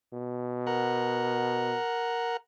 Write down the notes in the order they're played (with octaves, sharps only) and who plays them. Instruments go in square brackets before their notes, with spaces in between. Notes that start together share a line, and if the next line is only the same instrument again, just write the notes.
[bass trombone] B2
[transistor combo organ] A#4 F#5